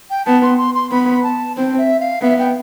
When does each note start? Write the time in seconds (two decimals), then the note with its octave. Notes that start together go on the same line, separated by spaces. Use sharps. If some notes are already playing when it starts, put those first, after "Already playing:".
0.10 G5
0.26 B3 A5
0.42 C6
0.58 C6
0.75 C6
0.91 B3 B5
1.23 A5
1.57 C4 C5
1.78 E5
2.00 F5
2.22 B3 E5
2.39 G5